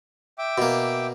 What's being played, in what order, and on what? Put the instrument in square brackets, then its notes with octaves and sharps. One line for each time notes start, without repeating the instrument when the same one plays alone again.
[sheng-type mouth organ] E5 G5 D6
[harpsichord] B2 A#3